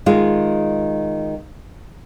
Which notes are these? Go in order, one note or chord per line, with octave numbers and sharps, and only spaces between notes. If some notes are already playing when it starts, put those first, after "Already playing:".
D#3 G#3 F4